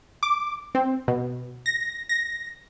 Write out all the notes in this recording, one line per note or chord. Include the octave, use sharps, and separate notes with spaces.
D6
C4
B2
A#6
A#6